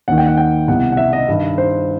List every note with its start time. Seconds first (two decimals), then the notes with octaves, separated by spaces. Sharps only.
0.08 D#2 D#3 F#5
0.18 G5
0.27 F#5
0.38 G5
0.68 C2 B2 F#5
0.92 F#5
0.97 E5
1.13 D#5
1.28 G2 D#3
1.58 C5